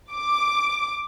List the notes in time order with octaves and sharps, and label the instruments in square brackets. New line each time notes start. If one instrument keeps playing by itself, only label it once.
[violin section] D6